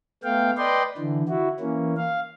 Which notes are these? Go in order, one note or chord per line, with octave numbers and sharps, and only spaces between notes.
A3 B3 F5 G5
B4 D5 D#5 G5 C6
D3 E3
E4 F#4
E3 A#3 C#4
F5